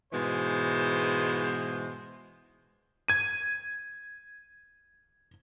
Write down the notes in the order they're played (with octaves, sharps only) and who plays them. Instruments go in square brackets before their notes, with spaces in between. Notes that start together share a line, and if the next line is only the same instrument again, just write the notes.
[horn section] G#2 B2 E3 G#3 C5
[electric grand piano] G#6 D#7